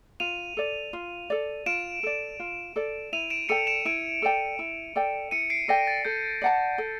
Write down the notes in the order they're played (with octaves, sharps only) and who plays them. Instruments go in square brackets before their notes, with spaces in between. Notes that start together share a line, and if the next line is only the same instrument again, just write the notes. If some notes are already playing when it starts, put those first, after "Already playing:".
[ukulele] F4 [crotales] D#7 F7
[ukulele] A4 D5
F4
A4 D5
[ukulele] F4 [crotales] D7 E7
[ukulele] A4 D5
F4
A4 D5
[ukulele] E4 [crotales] D#7 F7
[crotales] D7 E7
[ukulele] A4 D5 G5 [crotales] C#7 D#7
[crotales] D7 E7
[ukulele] E4 [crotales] D7 E7
[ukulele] A4 D5 G5
E4
A4 D5 G5
[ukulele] E4 [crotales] C#7 D#7
[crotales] C7 D7
[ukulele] A4 D5 G5 [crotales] A#6
[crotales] A6
[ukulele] A4 [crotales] G6
[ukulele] D5 F#5 A5
A4